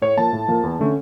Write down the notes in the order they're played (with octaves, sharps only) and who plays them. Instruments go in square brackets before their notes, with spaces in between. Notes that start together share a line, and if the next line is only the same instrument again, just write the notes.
[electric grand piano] A2 C#5
F3 A#3 A5
A2
F3 A#3
E2
D3 A3 C#4